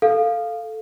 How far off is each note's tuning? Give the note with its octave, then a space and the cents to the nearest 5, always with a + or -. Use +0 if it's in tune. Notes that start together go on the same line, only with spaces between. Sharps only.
A4 +0 F5 +0